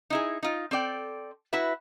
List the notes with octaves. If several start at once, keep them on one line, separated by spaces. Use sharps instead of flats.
D#4 E4 G#4
D#4 F4
C4 A4 D5 G5
E4 F#4 B4 E5